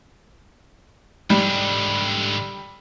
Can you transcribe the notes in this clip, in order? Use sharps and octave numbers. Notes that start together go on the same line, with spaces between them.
G#2 D3 G3